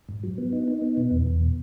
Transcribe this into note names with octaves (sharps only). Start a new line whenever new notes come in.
G#2
F#3
B3
D#4
D#4
B3
B2
E2
E2
B2